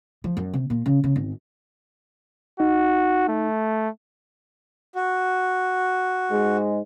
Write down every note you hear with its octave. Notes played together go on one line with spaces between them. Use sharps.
F3
F#2
C3
A#2
C#3
C#3
G#1
D#4 F#4
A3
F#4
G#2 G#3